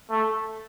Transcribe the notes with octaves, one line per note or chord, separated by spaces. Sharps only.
A3